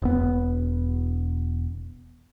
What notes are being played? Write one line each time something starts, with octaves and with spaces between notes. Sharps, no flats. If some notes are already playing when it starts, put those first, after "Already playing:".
E1 B3